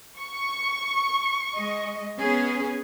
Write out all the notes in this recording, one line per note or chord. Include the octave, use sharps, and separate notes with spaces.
C#6
G#3 D#5
B3 C#4 G#4